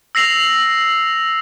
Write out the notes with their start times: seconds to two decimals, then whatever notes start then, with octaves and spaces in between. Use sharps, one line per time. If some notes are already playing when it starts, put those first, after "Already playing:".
0.15 E6 A#6 C7 F7 F#7